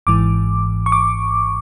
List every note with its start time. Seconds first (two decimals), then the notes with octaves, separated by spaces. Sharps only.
0.07 G#1 G#2 E3 D6
0.86 C#6
0.92 D6